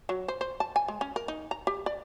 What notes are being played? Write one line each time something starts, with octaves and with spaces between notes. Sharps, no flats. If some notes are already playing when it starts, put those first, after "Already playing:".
F#3
C5
C5
A5
G#5
G#3
C#4
A#4
D#4
A#5
G4
D5